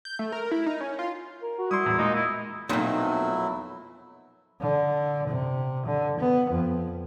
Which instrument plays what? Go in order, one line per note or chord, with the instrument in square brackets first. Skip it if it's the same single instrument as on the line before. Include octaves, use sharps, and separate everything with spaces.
[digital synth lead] G6
A3
A#4
E4
D#4
C#4
F4
[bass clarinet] A#4
[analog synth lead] F#4
[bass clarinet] G3 [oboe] E4 [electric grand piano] C6 D#6
[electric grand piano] E2 [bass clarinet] A2
[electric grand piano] A#2 [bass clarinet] G#3 [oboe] D#4 [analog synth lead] D#5
[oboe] E4
[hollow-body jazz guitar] B1 F2 A#2 [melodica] F#3 A3 E4 [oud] C4 D#4
[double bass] D3
C3
D3
B3
F2